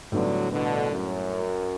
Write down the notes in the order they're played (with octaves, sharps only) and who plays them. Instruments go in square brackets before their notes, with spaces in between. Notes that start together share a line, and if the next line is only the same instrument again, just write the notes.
[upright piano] A2 G3 B3 D4 [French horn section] D3 F#3
[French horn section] B2 D3
F#2